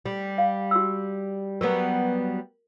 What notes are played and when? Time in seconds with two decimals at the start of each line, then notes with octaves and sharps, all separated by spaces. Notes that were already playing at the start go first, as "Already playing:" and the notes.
0.06 G3
0.38 F5
0.71 F#4 E6
1.61 F#3 G3 B3 A#4